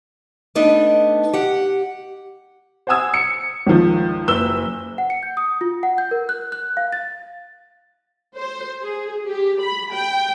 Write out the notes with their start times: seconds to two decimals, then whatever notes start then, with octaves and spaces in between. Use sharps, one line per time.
0.55 A3 B3 D4 D#4
1.33 G4 F#5
2.87 C5 F#5 G#5 D#6 E6 G#6
3.14 C#7
3.67 C#2 D#3 F3
4.28 F#1 B4 E6 G7
4.98 F#5
5.10 C#7
5.23 G6
5.37 D#6
5.61 F4
5.83 F#5
5.98 G6
6.11 A#4
6.29 F#6
6.52 F#6
6.77 F5
6.93 A6
8.36 C5
8.83 G#4
9.28 G4
9.62 B5
9.94 G5